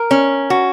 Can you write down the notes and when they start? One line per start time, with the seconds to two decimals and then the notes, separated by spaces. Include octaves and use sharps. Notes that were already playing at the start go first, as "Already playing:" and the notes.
Already playing: A#4
0.11 C#4
0.50 F#4